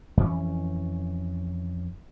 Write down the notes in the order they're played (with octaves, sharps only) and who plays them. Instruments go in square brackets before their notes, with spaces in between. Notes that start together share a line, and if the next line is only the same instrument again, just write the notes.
[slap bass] F2 E3 C#4